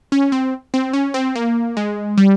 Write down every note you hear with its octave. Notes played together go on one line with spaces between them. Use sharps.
C#4
C4
C4
C#4
C4
A#3
G#3
G3